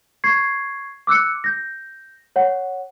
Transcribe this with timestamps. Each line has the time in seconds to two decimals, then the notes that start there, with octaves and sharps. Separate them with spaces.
0.24 C#6 G#6 C7
1.07 D6 E6 F#6 C#7
1.44 G6 A#6
2.36 C#5 F#5